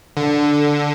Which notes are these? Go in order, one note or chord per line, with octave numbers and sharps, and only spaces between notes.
D3